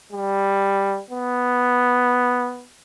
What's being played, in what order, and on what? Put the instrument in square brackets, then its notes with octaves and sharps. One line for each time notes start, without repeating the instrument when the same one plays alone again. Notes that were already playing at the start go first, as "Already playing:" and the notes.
[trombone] G3
B3